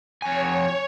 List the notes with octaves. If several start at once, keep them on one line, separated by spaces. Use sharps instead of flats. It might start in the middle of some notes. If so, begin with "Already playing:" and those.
F2 C#5 G#5